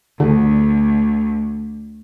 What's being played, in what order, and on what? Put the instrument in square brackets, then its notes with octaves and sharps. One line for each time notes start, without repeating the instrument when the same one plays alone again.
[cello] D2 [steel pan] D3